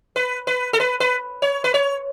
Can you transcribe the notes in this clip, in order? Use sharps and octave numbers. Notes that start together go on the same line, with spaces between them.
B4
B4
A4
B4
B4
C#5
B4
C#5